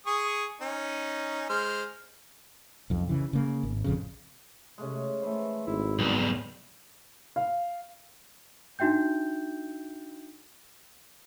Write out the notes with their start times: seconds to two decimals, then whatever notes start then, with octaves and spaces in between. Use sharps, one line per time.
0.06 G#4 C#6 D#6
0.61 C#4 D#4
1.49 G#3 C5 F6
2.90 B1 F2
3.09 C#3 E3
3.33 C#3 A#3
3.63 G#1
3.84 A1 F2 C#3
4.78 C3 G#3 A3 C#4
5.22 E3 A3 C5
5.67 G#1 E4 C6
5.99 B1 E2 G3 D#4 G#5 B5
7.36 F5
8.79 D4 D#4 F#4 E5 G5 G6